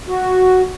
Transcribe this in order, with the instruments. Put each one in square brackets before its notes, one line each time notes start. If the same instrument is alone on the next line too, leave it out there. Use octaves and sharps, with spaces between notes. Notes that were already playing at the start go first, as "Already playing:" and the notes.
[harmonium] F#4